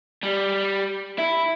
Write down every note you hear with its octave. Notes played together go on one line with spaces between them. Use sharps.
G3
E4